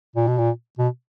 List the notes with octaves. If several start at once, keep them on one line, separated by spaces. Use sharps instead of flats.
A#2
B2
A#2
B2